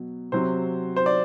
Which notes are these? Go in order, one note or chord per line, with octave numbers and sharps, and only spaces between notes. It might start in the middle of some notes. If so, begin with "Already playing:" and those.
Already playing: B2 F#3
C3 F#3 C4 C5
C5
D5